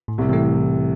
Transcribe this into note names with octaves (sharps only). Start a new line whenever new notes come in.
A2
C2 C3
C3 E3 A3